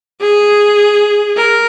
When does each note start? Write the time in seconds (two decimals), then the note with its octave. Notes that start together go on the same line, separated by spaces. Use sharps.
0.21 G#4
1.37 A#4